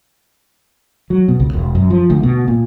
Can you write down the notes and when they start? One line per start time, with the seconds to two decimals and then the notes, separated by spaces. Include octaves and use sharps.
1.10 F#3
1.28 B2
1.40 C#2
1.53 E1
1.75 F#2
1.90 F3
2.10 D2
2.23 B2
2.48 A#2